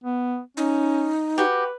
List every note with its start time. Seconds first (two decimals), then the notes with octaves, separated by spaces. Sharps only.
0.04 B3
0.57 C#4 D#4
1.38 F#4 G4 B4